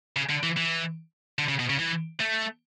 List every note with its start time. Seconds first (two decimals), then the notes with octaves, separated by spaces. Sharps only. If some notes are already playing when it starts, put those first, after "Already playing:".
0.16 C#3
0.29 D3
0.43 E3
0.57 E3
1.39 D3
1.49 C#3
1.59 B2
1.70 C#3
1.79 E3
2.20 A3